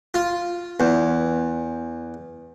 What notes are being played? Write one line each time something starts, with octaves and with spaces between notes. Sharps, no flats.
F4
E2